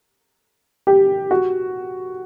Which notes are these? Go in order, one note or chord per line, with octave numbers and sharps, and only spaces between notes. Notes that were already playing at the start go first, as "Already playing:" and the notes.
G4
F#4